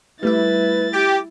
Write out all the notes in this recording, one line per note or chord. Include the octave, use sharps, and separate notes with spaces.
G3 A3 E4 B4 E5 A6
G4